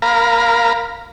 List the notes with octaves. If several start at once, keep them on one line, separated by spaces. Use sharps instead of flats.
A#4 F5 A#5 B5